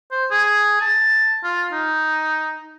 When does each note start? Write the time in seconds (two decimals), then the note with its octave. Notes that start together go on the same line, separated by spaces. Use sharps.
0.11 C5
0.31 G#4
0.81 A5
1.44 F4
1.72 D#4